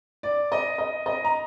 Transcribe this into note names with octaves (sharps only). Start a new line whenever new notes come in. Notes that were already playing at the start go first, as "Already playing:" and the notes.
D5
D#5
D#5
D#5
A#5